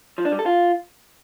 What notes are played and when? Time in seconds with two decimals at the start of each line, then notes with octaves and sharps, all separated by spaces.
0.18 F3
0.25 D4
0.32 G3
0.39 A4
0.46 F4